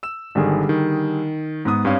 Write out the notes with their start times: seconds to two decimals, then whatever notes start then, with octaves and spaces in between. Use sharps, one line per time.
0.03 E6 E7
0.35 G#1 D3 D#3 G3 G#4
0.69 D#3
1.65 G#2 B3 D#6
1.85 G2 C4 C#5 F5